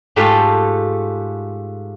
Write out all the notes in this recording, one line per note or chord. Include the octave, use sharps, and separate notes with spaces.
G#2 A3 F4 G4 A4 C6